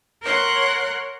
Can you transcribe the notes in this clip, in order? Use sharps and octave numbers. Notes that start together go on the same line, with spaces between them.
A#4 C#5 F#5 C6 F#6